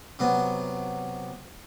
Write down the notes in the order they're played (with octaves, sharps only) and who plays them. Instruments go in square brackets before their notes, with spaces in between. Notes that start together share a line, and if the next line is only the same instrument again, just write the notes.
[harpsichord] C3 F#3 B3